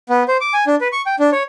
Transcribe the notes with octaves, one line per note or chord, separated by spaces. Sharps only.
B3
C5
D6
G#5
D4
B4
C#6
G5
D4
C#5